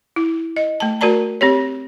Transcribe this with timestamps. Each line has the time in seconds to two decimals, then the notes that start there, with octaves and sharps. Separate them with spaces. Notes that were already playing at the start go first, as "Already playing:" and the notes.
0.16 E4
0.56 D#5
0.80 A3 A5
1.01 A3 F#4 A#4 D5 A5 A#5
1.41 C4 G4 C#5